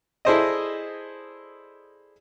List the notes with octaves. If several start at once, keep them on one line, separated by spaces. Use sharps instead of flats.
E4 G#4 A4 C5 D5 D#5